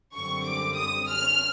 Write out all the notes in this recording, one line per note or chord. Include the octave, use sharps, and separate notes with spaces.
F#2 D3 G3 C4 C#6
D6
D#6
F6